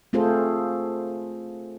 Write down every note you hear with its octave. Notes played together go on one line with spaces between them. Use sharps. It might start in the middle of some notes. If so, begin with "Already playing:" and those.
A3 C4 F4 G#4 A4 C5